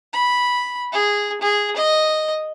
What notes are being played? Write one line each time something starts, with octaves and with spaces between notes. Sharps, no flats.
B5
G#4
G#4
D#5